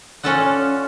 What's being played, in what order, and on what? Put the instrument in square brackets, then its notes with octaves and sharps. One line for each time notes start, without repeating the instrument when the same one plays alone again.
[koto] C#4 F4 A4 D5 F#5